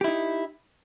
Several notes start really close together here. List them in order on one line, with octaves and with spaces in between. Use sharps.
G4 E4 D#4